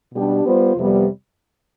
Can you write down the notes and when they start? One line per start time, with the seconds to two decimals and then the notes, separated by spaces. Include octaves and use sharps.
0.13 B2 G3 D4 G4
0.44 G3 B3 F4 C5
0.75 F2 C3 G3 B3